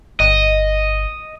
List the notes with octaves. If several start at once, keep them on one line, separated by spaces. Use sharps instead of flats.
G1 D#5